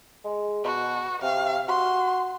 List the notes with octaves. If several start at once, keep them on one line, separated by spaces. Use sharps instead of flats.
G#3
B2 F#4
C3 F5
F#4 C6